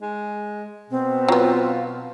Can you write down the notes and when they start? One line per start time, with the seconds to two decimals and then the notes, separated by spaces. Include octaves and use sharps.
0.02 G#3
0.90 B2 C4
1.28 F#3 B3 F4